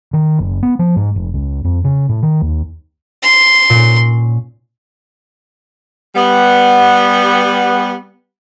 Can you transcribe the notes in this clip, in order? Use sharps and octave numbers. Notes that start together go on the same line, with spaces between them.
D#3
F#1
B3
F3
G#2
F1
C#2
F2
C#3
A2
D#3
D#2
C6
A#2 C#4
G3 B3